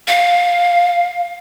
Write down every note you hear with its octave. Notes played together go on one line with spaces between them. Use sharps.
F5